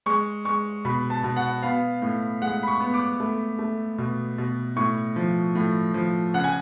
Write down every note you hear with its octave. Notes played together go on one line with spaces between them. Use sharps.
G#3 C#6
G#3 C#6
B2 B5
A5
B2
F#5
B3 F5
A2
G#3 F#5
B5
C#6
B3
D6
A3
A3
B2
B2
A2 C#6
F3
A2
F3
C#3 F#5
G#5